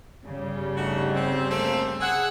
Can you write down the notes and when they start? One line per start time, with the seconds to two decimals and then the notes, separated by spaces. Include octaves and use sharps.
0.24 G1 C#3 G3
0.75 A3 D#4 F#4
1.14 C4
1.49 A3 A#3 C4
2.00 G#4 F#5 E6 F#6 G#6